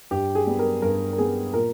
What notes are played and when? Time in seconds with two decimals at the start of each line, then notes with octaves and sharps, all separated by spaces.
0.11 G2 G4
0.35 G#4
0.47 G3 B3
0.59 A#4
0.82 G2 A#4
1.13 A#4
1.18 G3 B3 G#4
1.53 A#2 A#4